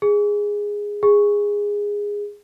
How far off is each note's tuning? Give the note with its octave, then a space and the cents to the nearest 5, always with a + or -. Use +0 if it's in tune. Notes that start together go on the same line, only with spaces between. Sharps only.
G#4 -10
G#4 -15